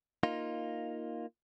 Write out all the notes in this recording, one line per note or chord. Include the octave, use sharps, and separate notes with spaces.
A#3 D#4 F4